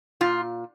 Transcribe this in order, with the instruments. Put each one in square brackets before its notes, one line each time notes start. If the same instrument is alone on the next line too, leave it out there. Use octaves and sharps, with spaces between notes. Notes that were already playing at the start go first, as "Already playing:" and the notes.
[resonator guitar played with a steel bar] A#2 F4